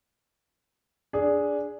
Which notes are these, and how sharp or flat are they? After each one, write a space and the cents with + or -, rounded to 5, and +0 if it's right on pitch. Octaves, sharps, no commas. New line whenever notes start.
D4 -10 G#4 +0